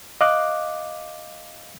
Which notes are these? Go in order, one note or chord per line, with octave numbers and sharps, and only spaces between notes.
D#5 F5 D6 F#6